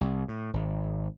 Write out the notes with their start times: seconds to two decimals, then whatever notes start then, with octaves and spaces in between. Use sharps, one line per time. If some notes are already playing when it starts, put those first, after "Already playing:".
0.01 C2
0.28 A2
0.53 G#1